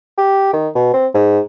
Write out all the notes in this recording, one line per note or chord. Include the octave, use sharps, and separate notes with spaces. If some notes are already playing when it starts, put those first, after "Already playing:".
G4
D#3
B2
C4
G#2